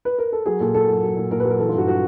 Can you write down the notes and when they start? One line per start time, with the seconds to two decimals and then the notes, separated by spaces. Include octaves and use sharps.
0.05 B4
0.18 A#4
0.33 A4
0.46 F#3 G#4
0.60 A#2 A4
0.74 A#2 A4
0.88 F#3
1.03 F#3
1.17 A#2
1.31 A#2 A#4
1.40 B4
1.45 F#3
1.50 A#4
1.59 E3 A4
1.69 F4
1.73 G2 F#4
1.88 F#4